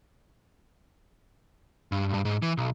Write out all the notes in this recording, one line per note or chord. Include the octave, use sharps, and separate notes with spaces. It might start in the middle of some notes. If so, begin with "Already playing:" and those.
G2
G2
G#2
E3
B1